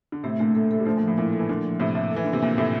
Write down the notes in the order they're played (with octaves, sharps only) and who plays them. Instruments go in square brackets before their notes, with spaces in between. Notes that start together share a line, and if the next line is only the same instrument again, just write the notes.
[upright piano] D3
[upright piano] A2 C3 [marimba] A3
[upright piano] A#2 D3 [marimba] A3
[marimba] A4
A4
[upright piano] G3
[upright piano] D3 F3 [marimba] A3
[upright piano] A#2
[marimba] F3
[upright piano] A2
[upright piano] A#2 [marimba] E4
[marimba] A4
[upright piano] E3
[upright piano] A#2 D3 [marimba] A#3
[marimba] F3
[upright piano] A2 C3 [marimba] F3
[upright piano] A2 [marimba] F3
[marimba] A4
[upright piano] E3
[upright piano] D3 [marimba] A#3
[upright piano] C3
[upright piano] A#2 [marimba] F4
[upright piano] A2 C3 [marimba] A4